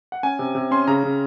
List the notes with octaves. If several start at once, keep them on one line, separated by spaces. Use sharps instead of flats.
F#5
C#4 G#5
C3
C3
C#4 C6
C#3 A#5
C#3